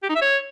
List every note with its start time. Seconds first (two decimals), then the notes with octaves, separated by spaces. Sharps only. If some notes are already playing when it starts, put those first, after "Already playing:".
0.03 G4
0.09 D#4
0.15 E5
0.22 C#5